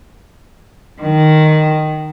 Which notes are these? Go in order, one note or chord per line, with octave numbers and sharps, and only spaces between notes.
D#3